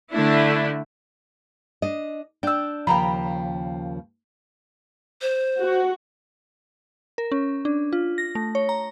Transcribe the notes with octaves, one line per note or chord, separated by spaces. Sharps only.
D3 A3 D4 E4
D4 D#5
D4 G5 E6
D#2 C#3 F3 G5 A#5 B5
C5
F#4
A#4
C#4
D4
F4
A#6
A3
C#5
A#5